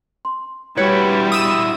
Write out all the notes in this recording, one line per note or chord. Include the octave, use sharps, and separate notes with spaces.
C6
G3 E4 F#4 B4 C#5 G#6 C#7
D#6 E6 E7